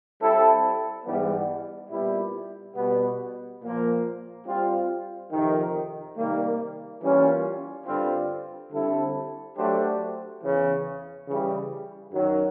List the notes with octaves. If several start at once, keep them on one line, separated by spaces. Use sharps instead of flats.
G3 C4 E4 A4
G#2 E3 G3 B3
A#2 G3 B3 E4
B2 G3 B3
A#2 F3 A#3
G3 C4 F4
F2 C3 D#3
C3 D#3 G3 A#3
E3 G3 A#3 C#4 F4
G2 D3 G3 C4 F4
D3 G3 C4 E4 A4
F#3 A3 D4 G4 C5
E2 C#3 E3
C#3 E3 G3
F#2 D#3 F#3